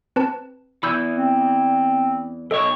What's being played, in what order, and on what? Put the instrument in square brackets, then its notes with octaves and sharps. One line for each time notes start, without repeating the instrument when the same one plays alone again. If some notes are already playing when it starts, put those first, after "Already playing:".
[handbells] C4 B4 A5
[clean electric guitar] E2 E3 [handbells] B5 E6 G6
[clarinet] C4
[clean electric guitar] B1 C#5 [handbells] A4 D#5